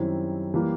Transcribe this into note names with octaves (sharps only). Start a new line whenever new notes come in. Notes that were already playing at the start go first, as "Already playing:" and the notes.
Already playing: F#2 D#3 G3 C4 E4
E3 G3 A#3